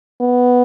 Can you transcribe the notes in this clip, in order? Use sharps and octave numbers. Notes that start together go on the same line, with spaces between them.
B3